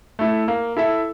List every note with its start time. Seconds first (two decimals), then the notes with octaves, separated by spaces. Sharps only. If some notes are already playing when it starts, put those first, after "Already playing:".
0.19 A3 E4
0.48 A#3
0.77 E4 A4 E5